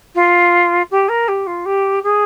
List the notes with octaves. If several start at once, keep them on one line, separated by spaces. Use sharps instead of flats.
F4
G4
A#4
G4
F4
G4
G#4